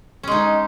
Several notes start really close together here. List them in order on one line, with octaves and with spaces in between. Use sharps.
C#4 G#3 D#4